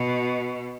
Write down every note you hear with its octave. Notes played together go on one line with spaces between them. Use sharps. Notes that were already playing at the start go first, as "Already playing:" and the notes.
Already playing: B2